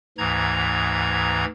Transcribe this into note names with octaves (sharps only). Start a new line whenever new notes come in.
D2 G#2 E3 A#5 G#6